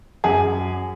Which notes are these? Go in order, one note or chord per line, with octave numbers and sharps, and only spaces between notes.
F#2 G#4